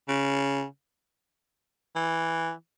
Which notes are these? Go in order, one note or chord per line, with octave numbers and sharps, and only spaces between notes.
C#3
E3